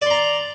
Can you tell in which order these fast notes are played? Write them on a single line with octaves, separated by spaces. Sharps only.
D5 C6 A#5